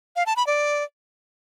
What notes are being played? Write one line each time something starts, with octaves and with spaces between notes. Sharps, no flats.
F5
A5
B5
D5